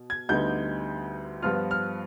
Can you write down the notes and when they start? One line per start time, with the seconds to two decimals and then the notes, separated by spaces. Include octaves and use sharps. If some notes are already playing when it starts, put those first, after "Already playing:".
Already playing: B2
0.10 G#6
0.29 D2 D3 G3 B3 D#4 G6
1.42 G2 F3 B3 F4 F6
1.71 F6